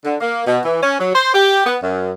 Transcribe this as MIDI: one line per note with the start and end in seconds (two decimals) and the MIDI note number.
0.04 0.16 50
0.21 0.42 58
0.46 0.59 47
0.65 0.79 52
0.82 0.98 61
0.99 1.12 54
1.14 1.31 72
1.33 1.63 67
1.66 1.76 59
1.82 2.11 42